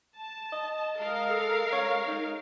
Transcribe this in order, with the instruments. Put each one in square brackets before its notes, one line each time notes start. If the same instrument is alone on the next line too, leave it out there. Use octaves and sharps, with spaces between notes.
[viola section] A5
[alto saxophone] D#5
[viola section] G#3 A#4 F5
[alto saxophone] A4
C#5
D#4